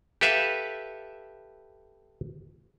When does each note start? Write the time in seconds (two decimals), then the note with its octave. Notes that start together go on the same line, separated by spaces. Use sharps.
0.21 G4 A4 B4 E5 F5